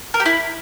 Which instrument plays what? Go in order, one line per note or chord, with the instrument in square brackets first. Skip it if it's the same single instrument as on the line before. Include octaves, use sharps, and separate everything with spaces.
[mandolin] A#4
G4
E4